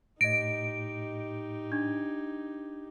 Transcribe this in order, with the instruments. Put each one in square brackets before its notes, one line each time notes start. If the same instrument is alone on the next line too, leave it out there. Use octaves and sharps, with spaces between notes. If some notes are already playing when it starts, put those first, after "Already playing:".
[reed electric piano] A2 [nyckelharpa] D#4 G4 [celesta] D#5 A#6 [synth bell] D7
[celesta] D4 G#6